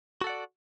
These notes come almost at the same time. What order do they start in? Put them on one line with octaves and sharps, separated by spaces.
F#4 A4 F#5 D5